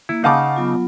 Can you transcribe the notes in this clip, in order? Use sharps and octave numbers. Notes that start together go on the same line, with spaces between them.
A#3 E4
C#3 D#4 F5 F#5 A5 D6
F#3 B3 F4